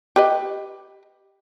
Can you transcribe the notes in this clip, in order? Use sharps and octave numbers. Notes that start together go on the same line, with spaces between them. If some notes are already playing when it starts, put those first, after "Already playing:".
G4 B4 D#5